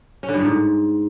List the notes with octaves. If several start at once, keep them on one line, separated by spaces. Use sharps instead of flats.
C#4
D3
G2
A2
G#2